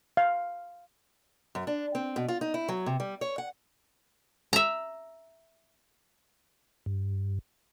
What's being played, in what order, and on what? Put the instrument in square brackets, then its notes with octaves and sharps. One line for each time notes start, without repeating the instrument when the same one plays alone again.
[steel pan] F5
[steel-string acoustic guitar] F#2
D4
C4
B2
F4
D#4
E4
F#3
C3
G3
C#5
F#5
[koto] E5 A#5
[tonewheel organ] G2